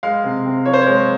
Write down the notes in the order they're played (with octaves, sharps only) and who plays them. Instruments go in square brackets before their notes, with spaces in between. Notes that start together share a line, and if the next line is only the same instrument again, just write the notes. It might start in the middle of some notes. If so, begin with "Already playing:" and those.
[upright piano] G#3 F5
C3
C3
F3 C#5
C5
G#3 C#5